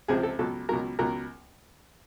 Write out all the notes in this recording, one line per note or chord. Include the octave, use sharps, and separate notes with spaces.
C#2 C3 F3 G#4
A4
C#2 B2 F#3 A4
C#2 B2 F#3 A#4
C#2 B2 F#3 A#4